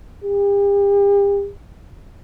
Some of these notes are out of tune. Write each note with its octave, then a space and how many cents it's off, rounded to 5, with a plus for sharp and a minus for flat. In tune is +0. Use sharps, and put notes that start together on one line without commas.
G4 +40